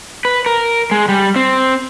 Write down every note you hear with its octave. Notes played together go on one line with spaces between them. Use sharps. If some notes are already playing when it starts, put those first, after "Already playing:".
B4
A#4
G#3
G3
C4